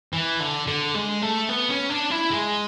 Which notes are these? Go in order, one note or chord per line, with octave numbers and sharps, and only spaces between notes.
E3
D3
D3
G#3
A3
B3
C#4
D4
E4
G#3